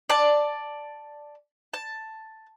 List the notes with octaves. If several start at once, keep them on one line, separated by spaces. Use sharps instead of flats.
D5 A5
A5